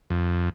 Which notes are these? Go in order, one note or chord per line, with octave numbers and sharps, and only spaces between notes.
F2